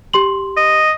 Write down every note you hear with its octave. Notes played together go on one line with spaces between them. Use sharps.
G4 C6 F#7
D#5